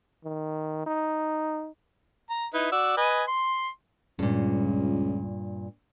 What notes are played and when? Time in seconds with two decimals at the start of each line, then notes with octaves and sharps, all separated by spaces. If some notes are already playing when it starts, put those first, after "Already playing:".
0.24 D#3
0.86 D#4
2.30 A#5
2.54 D#4 E4 B4
2.72 F#4 D5 E6
2.97 B4 D#5 G#5
3.28 C6
4.19 C#2 G2 A#2